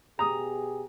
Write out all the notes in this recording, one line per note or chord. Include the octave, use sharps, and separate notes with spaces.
B2 G4 G#4 A#5 D#6